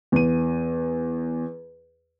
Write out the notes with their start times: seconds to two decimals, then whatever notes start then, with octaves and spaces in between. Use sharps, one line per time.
0.12 E2 D#7